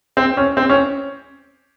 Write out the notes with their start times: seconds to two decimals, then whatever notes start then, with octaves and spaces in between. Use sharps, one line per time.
0.17 C4
0.37 C#4
0.57 C4
0.70 C#4